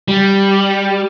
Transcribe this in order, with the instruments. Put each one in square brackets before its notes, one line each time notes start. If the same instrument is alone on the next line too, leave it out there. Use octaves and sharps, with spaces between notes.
[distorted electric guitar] G3